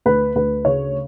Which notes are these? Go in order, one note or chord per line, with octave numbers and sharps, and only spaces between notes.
D2 B4
D2 B4
C#3 C#5